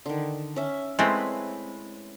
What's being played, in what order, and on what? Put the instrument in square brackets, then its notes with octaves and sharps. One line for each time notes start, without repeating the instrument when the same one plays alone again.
[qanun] D3 D#3
C#4 E5
[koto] G#3 A3 C4 [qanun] E4 B4